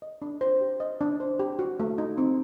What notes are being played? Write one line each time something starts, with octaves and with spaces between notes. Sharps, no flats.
D#5
D4
C5
G4
D#5
D4
C5
G4
F#4
A3
D#4
C4